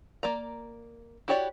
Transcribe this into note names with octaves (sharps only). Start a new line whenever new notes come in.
A#3 D5 A#5
E4 F#4 G4 C#5 D5